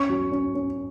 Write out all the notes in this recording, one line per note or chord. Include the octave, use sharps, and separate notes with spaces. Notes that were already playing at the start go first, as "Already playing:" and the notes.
Already playing: C#4 C#6
F#3
C#4
C#4